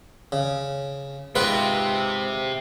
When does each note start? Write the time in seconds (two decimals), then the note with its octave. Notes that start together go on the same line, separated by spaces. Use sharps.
0.32 C#3
1.35 G#2 C3 F4 B4